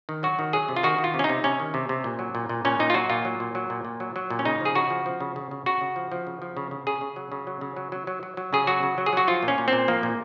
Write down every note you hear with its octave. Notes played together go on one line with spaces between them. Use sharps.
D#3
F#3 F#4
D#3
F#3 G#4
C3
F4
D#3 F#4
D#3
F4
C3
C#4
D#4
C3
C3 C#4
D#3
C3
C3
A#2
F#3
A#2
A#2
A#2 C#4
A#2 D#4
F4
F#3 F#4
A#2 F4
F#3
A#2
F#3
A#2
A#2
F#3
F#3
A#2
C#4
C#3 D#4
F3 G#4
C#3 F#4
F3
F3
C#3
C#3
C#3
C#3 F#4
C#3
F3
F3
C#3
F3
C#3
C#3
C#3 G#4
C#3
F#3
C#3
F#3
C#3
F#3
F#3
F#3
F#3
F#3
C#3 G#4
F#3 F#4
C#3
F#3
G#4
F#3 F#4
F3 F4
A#2
C#4
A#2
C4
A#2
F3 A#3
A#2